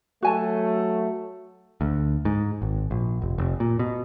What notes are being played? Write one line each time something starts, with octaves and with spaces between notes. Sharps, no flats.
F#3 A3 F#4 G#5 A5
D2
G#2
G#1
A#1
F1
F1
A#2
B2